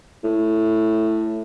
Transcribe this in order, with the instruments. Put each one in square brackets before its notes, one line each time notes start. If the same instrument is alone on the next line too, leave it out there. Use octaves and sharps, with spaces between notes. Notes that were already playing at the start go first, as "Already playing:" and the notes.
[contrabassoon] A2